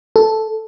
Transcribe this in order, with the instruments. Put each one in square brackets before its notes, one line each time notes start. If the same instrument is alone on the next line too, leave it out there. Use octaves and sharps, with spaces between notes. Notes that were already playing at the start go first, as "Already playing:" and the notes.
[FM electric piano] A4